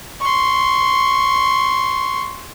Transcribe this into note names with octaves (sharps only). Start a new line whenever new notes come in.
C6 C#6